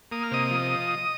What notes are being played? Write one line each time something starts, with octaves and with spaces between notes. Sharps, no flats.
A#3 D#6
F6
C3 D#5 D#6
F3